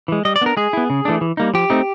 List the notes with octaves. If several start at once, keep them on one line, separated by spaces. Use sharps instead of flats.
E3 G#3
G3 D#5
D5
B3 D4 A#4
G#3 G#4
B3 E4
C#3
E3 A3 D4
E3
G3 A#3 D#4
F3 G4
A3 C4 D#4